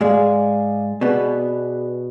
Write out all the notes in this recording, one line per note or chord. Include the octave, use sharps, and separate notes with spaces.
G#2 G#3 G#4 D5 F5 G#5
B2 B3 G#4 B4 D5